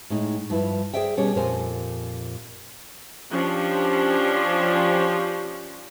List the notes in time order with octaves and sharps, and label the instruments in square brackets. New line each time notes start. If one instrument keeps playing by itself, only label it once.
[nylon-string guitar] A2 G#3 D#4
G2 F3 E4 B4
G#4 C5 D5 E5 G5
B2 G3 C#4 G4 G#4 C#5
F2 A#2 G4 A#4 C5 G#5
[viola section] F3 C#4 D4 G4